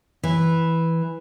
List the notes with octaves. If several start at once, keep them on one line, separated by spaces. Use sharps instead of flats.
E3